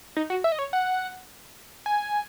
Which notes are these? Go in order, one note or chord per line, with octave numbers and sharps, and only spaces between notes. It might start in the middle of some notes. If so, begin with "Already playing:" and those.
D#4
F#4
E5
D#5
C#5
F#5
G#5